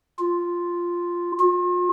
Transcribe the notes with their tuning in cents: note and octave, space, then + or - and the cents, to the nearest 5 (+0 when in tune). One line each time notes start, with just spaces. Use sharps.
F4 +0
F4 +40